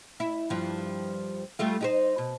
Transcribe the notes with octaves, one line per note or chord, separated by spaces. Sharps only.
E4
G2 F3
G3 A3 F4
D#4 G4 C5
B2